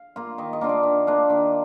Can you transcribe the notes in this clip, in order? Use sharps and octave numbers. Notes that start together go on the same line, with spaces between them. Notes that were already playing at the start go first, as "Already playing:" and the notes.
Already playing: F5
A#3 F4
D#3 D#5
D#5
A#3 D4 F4
D5
D#3
A#3 D4 F4
D#3